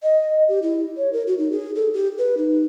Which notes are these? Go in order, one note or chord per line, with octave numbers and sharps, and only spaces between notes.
D#5
G4
E4
C#5
A#4
F#4
D#4
G#4
A4
G4
B4
D#4